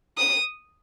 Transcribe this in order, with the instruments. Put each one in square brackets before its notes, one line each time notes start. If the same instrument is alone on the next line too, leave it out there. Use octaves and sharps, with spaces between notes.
[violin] D#6